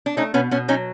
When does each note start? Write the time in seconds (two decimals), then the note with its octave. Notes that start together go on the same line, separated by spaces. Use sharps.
0.06 D4
0.17 A3 C#4 D#4
0.34 B2 B3 C#4
0.51 B2 B3 C#4
0.68 F#3 C#4 D#4